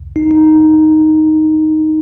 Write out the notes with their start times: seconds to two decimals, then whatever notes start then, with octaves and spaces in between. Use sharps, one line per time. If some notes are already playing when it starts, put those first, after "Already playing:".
0.16 D#4
0.31 D#4